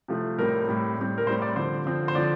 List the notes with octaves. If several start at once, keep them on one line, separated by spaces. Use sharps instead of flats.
C3 F3 A3 C4
A2 G3 C4 A#4
A2 G3 C4
A2 G3 C4
A#4
A2 G3 C4 C5
D5
D3 F3 C4 C5
D3 F3 C4
C5
D3 F3 C4 D5